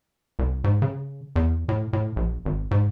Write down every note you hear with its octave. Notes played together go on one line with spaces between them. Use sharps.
C2
G#2
C#3
E2
A2
A2
A#1
G#1
G#2